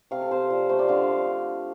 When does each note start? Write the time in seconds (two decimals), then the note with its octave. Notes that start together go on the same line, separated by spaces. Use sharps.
0.11 C3 F5
0.21 A4
0.31 C3 C5
0.50 F3 D5
0.69 A3 C5
0.79 D5
0.88 D3 F5